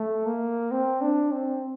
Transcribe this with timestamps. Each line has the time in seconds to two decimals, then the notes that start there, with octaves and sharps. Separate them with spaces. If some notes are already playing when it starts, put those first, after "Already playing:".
Already playing: A3
0.26 A#3
0.71 C4
1.01 D4
1.32 C4